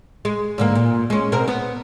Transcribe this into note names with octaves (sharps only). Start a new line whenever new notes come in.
G#3
G#2 D3 A#3
A#2
G#3 C#4
B2 C4 A#4
B3